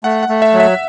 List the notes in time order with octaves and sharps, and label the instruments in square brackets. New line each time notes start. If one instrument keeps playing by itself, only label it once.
[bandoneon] A3 [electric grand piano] F#5
[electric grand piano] F#5
[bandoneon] A3
[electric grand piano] E5
[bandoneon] F#3
[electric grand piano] E5